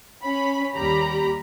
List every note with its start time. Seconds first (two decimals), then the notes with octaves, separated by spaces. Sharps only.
0.23 C#4 B5
0.75 D#2 G3 G4 A#5 B5